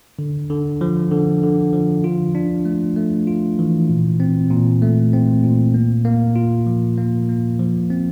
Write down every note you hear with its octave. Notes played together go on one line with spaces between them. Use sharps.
D3
D3
F3
D3
D3
F3
F4
D4
A3
A3
F4
E3
A#2
C4
A#2
A3
C4
A#2
A#3
A#3
F4
F3
A#3
A#3
F3
C4